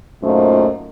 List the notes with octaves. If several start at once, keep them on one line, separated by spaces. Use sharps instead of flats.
F#2 A#2 A3 D#4 F4 C5